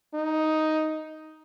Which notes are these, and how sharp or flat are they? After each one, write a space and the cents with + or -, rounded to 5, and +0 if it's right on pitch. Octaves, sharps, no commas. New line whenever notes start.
D#4 +5